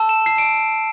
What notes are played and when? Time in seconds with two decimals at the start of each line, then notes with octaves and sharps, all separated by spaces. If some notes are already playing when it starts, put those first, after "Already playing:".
Already playing: A5 E6
0.09 E7
0.26 C7
0.38 D7